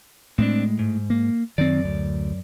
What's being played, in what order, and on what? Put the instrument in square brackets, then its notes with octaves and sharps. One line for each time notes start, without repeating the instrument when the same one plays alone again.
[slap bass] A2 G#3 [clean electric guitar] C4 D4
[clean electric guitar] G#2
[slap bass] A#3
[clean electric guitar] F#2 D5 [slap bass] D#3 C4
[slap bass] D2